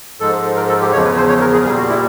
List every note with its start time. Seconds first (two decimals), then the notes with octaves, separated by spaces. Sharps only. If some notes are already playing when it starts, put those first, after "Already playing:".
0.20 G#2 F3 G#3 A4
0.56 A#4
0.69 A4
0.81 G4
0.93 E2 C#3 F3 C#5
1.05 B4
1.16 C5
1.29 C#5
1.41 A#4
1.53 G#4
1.65 A#2 G3 G#4
1.77 F#4
1.90 E4